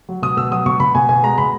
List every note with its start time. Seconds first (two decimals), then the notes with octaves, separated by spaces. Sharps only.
0.09 F#3
0.22 B2 D#6
0.37 B2 E6
0.51 F#3 D#6
0.66 B2 C#6
0.80 B2 B5
0.95 B2 G#5
1.09 B2 G#5
1.23 G#3 A#5
1.38 B2 B5